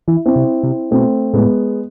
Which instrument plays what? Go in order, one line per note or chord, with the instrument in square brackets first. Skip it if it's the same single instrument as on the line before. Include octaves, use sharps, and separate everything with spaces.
[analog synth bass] E3 [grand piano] E4
[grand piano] C4 E4
[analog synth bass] C3
C3
[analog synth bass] B2 [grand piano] A3 C4
[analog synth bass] A2 [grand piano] G#3 B3